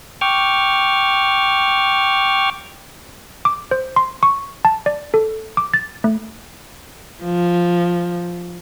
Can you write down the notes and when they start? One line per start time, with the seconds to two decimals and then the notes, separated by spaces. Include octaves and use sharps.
0.21 G5 C#6 D6 F6
3.45 D6
3.71 C5
3.96 C6
4.23 C#6
4.65 A5
4.86 D5
5.14 A4
5.57 D6
5.74 A6
6.04 A3
7.23 F3